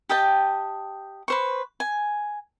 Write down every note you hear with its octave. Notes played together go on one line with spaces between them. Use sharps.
G4 D#5 G5 A5
B4 C5 C#6
G#5